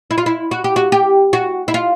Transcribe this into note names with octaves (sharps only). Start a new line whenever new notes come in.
E4
F4
E4
F#4
G4
F#4
G4
F#4
E4
F4